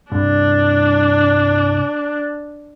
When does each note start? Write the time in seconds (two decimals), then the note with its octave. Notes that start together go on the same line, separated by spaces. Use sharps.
0.12 C2 G2 D4